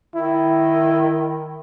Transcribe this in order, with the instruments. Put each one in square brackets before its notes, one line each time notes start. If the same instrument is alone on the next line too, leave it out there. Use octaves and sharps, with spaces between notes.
[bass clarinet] D#3 [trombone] E4